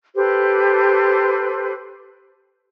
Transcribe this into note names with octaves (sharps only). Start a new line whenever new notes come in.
G4 A4 B4 C5